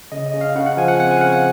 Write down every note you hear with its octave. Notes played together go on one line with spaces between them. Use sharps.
C#3 D#5
D#5
C#3
F5
C#3 F#5
F#5
F3 G#5
F#5
C4 F#5
G#5
F5
C#3 F#5
F#5